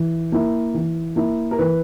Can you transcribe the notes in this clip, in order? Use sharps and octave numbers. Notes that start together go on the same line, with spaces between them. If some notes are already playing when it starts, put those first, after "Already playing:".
Already playing: E3
A#3 E4
E3
A#3 E4
A#4
E3 B4